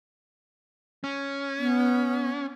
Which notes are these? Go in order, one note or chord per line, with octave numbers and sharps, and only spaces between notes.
C#4
B3